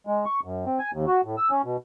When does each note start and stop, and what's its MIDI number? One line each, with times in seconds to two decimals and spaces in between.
0.07 0.25 56
0.26 0.40 85
0.44 0.65 42
0.66 0.79 60
0.79 0.91 80
0.93 1.05 39
1.07 1.21 66
1.25 1.36 45
1.37 1.50 88
1.51 1.62 61
1.64 1.77 47